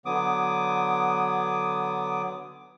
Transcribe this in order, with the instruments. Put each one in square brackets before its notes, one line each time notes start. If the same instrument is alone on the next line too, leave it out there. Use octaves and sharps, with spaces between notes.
[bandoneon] D3 F#3 B3 D6 D#6